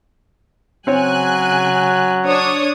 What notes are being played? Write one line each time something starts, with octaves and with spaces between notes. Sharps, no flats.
C#3 F#3 C4 C#5 G#5 F#6
D4 C#5 D#6